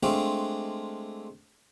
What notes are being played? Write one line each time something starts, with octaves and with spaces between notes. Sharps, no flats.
G#3 A3 C4 D4 F4